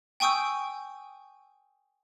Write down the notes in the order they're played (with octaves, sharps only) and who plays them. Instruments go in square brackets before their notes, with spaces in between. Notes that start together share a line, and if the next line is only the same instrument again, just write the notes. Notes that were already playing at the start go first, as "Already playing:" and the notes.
[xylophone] G5 G#5 C#6 D#6 E6 G6